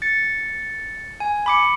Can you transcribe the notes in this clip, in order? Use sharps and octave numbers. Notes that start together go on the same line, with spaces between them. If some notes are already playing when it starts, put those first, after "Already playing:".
A6 C#7
G#5
B5 D6 C#7